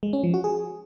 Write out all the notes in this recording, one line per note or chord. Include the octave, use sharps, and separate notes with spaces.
G#3
C#4
F3
F#4
G#4